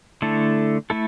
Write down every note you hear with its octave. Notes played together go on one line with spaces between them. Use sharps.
D3 A3 E4 A4
A3 E4 A4